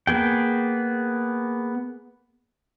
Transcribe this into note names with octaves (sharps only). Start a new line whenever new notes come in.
A#3 B3 G#4 G5